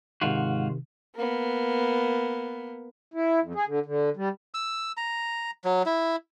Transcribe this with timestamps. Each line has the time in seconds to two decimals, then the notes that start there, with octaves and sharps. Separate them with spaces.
0.21 G#2 C3 D#3 F4 F#4
1.15 A#3 B3
3.14 E4
3.42 F2
3.55 G#4
3.67 D3
3.86 D3
4.17 G3
4.54 E6
4.97 A#5
5.65 F#3
5.86 E4